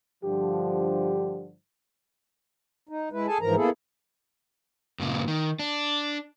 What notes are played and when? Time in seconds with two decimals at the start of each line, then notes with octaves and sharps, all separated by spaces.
0.24 G2 D3 F3 G4
2.89 D#4
3.12 G#3 E4 B4
3.27 G#4 A4 G#5 A5
3.41 G#2 E3 F3 A#4 A#5
3.56 A#3 B3 E4 G#4 A4
4.99 G2 A#2 C#3
5.28 D#3
5.59 D4